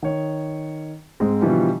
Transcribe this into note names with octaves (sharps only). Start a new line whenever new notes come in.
D#3 C#5
G#2 G#3 C4
B2 D3 E3 F3 G3